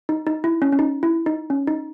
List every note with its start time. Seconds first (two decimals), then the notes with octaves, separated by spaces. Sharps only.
0.09 D#4
0.27 D#4
0.44 E4
0.62 C#4
0.72 C#4
0.79 D#4
1.03 E4
1.26 D#4
1.50 C#4
1.67 D#4